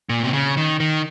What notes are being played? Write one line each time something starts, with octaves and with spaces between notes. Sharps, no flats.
A#2
C3
C#3
D#3
D#3